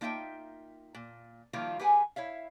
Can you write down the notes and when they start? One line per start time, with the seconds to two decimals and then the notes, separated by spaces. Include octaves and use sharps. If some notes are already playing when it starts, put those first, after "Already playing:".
0.01 A#3 D#4 F4 E5 F#5 G5
0.95 A#2
1.53 D#3 F3 G3 A#3 E4 F4
1.79 G4 G#4 B4 F#5 G#5
2.16 E4 C#5 E5 F5